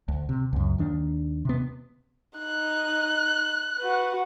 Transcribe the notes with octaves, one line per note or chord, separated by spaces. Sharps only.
D2
C3
C#2 F#2
D#2 D#3 D4
C3 B3
D#4 F#6
F#4 B4